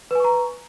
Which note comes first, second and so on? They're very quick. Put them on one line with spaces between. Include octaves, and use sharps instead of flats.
B4 G#5 C#6 A#5